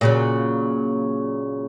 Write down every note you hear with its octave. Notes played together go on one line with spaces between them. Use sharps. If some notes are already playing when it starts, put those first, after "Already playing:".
A#2 C#3 F#3